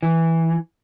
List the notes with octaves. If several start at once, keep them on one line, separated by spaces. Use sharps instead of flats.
E3